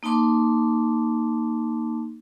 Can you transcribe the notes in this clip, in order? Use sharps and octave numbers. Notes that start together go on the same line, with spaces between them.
A#3 D#4 A5 C6 D6